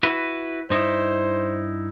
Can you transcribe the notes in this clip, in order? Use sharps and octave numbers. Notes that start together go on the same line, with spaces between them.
E4 F#4 B4
G2 D#4 E4 C5